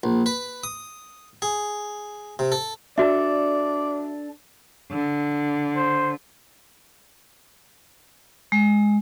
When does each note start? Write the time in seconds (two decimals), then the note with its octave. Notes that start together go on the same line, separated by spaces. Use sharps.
0.04 A#1
0.26 B4
0.64 D#6
1.42 G#4
2.39 C3
2.52 A4
2.98 D4 F#4 A4 D5 E5
4.91 D3
5.76 C5
8.52 G#3